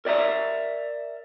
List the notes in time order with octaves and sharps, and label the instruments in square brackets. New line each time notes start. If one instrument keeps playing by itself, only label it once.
[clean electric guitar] A#4 D5 E5 A#5